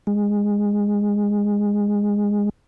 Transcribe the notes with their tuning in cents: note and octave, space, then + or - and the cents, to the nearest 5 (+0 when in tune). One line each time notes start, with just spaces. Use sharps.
G#3 -15